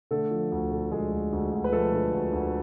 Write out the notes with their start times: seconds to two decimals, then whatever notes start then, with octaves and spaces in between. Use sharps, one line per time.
0.11 D3 A3 A4
0.31 F3
0.52 D2
0.71 D3
0.91 D2 G#3 G#4
1.12 D2
1.33 D2
1.53 D2
1.64 B4
1.72 F3 A3 A4
1.93 D3
2.13 D2
2.33 D2